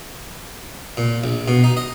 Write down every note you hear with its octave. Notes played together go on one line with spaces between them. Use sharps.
A#2
A#1
B2
D#4
D#5